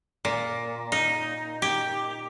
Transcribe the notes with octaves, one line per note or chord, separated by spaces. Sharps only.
A#2
D#4
G4